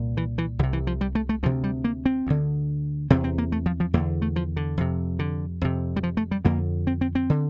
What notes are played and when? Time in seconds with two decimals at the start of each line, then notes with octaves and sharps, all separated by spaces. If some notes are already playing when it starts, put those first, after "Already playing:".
Already playing: C2 A#2
0.17 E3
0.38 E3
0.59 C2 D3
0.63 C3
0.73 E3
0.87 F3
1.01 G3
1.15 A3
1.29 A3
1.43 D2 C3 F3
1.64 G3
1.84 A#3
2.06 C4
2.27 D2 D3
3.10 E2 C3 C4
3.24 C4
3.38 A#3
3.52 A3
3.66 F3
3.80 F3
3.94 E2 A#3
3.97 D3
4.22 A3
4.36 F3
4.57 D3
4.78 F2 C3
5.19 D3
5.61 F2 C3
5.96 G3
6.03 F3
6.17 A3
6.31 G3
6.45 F2 D3 A#3
6.87 C4
7.01 C4
7.15 C4
7.30 D3